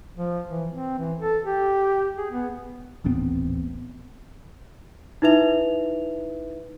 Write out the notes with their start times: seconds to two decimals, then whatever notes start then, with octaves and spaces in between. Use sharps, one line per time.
0.16 F3
0.49 E3
0.73 C4
0.98 E3
1.19 A4
1.45 G4
2.17 G#4
2.31 B3
3.04 D#1 A1 B3 C4
5.22 D#4 E4 B4 E5 F7